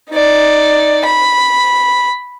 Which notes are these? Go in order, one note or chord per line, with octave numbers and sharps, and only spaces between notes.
D#4 D5
B5